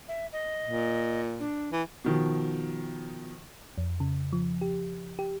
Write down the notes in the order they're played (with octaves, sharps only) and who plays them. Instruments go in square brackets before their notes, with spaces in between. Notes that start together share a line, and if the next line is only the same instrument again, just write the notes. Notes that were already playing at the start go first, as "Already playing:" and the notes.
[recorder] E5
D#5
[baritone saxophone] A#2
[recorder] D4
[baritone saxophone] E3
[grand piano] B2 D#3 F3
[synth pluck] F2
C#3
F3
G4
G4